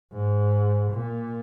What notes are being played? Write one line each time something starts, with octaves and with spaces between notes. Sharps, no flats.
G#2
A#2